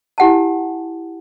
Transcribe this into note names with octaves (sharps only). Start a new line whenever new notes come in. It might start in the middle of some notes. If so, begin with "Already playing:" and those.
E4 G4 F#5 G#5 A5